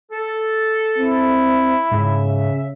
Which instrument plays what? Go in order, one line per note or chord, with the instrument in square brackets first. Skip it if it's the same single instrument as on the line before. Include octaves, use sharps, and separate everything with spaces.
[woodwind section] A4
[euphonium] C4 [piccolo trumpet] E4
[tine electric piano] G#2 [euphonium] C#3 [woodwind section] E5